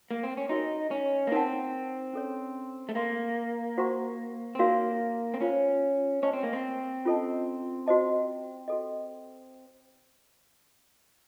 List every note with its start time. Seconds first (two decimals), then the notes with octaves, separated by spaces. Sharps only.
0.11 A#3
0.23 C4
0.37 C#4
0.49 D#4 F#4 A#4 D#5
0.91 C#4
1.27 A#3
1.32 C4 D#4 A#4 C#5 F#5 A5
2.14 C#4 A4 C#5
2.89 A3
2.95 A#3 A#4 F5 C6
3.78 F#4 C5 F#5 A#5 C#6
4.55 C4
4.59 A#3 D#4 F#4 A#4 C#5 F5
5.34 C4
5.41 C#4 F4 C5 F5
6.22 C#4 C5 D#5 A5 C#6
6.33 C4
6.43 A#3
6.53 C4
7.05 C#4 F4 A4 D#5 A5
7.86 F#4 C5 D#5 A5
8.68 F#4 A4 D#5